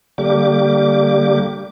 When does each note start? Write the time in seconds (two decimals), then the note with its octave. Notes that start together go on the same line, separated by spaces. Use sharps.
0.18 D3 G3 A#3 G4 D6